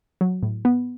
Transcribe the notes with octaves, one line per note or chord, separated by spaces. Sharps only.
F#3
A2
B3